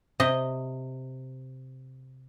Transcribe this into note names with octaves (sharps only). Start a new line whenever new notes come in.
C3 D#5